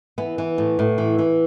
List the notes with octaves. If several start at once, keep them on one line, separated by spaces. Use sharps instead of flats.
E3 B3
E3
A2
A2
E3
E3